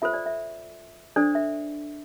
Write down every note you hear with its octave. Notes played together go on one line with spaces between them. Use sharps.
F4 A4 C5 E5
D5
E5
D4 A4 C5 D5
E5